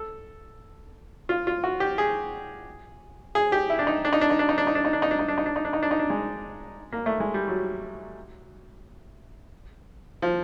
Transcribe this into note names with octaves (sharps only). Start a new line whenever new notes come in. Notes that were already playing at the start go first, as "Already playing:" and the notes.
Already playing: A4
F4
F4
F#4
G4
G#4
G#4
G4
E4
D4
D#4
D4
D#4
D4
D#4
D4
D#4
D4
D#4
D4
D#4
D4
D#4
D4
D#4
D4
D#4
D4
D#4
D4
D#4
D4
D#4
D4
G#3
A#3
A3
G#3
G3
F#3
F3